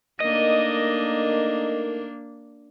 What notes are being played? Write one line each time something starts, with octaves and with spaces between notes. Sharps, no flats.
A3 A#3 D4 D#4 A#4 D#5